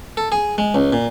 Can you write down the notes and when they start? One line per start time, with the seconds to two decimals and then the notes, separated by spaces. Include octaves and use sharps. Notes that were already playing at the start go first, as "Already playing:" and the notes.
0.17 A4
0.32 G#4
0.58 G#3
0.75 C#2
0.93 A#2